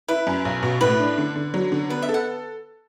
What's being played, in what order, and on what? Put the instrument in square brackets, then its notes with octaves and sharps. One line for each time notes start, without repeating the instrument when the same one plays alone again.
[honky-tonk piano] E4 [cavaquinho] B4
[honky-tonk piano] F#2
B1
B2
[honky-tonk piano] A2 [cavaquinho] B4
[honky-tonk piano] D4
D3
D3
F#3
D3
[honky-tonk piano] B3 [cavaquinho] B4
[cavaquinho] E5
[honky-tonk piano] A4
[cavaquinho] F#5